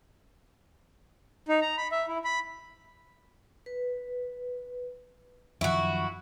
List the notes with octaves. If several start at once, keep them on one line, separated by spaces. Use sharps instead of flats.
D#4
A#5
B5
E5
E4
B5
B4
F#2 D#3 F3 E4 F#4 C#6